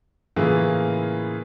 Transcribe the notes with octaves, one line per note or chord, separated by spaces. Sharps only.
A2 C#3 E3 A#3 F4 G#4